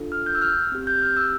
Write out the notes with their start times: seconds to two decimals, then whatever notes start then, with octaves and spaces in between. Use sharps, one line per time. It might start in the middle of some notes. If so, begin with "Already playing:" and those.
Already playing: D4 F4 A4
0.12 F6
0.26 G6
0.35 E6
0.42 F6
0.72 C4 G4
0.87 G6
1.02 F6
1.17 E6